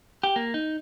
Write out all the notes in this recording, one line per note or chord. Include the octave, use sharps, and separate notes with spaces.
G4
A#3
D#4